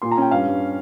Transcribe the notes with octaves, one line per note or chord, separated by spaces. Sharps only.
A#2 C6
A#5
C#4 G5
G2 F5
G2